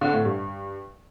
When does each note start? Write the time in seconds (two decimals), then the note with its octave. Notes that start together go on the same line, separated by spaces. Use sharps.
0.01 D3
0.13 A2
0.25 G2